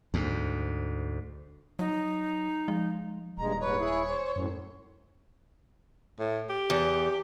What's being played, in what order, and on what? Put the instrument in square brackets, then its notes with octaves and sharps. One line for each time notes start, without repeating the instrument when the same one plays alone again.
[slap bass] D2 G#2
[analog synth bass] F#3 [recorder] D#4
[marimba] F3 [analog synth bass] G#3
[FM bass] D#1 [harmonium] G2 G#3 [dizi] A#5
[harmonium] D#2 G#2 B4 [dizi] C#5
[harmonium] E4 G#4
C5
[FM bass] F#2 [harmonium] A2
[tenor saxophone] A2
G4
[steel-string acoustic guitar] E2